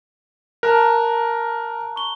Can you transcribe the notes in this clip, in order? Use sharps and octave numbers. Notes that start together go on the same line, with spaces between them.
A#4 A5 A#5 F#6
C#6 G7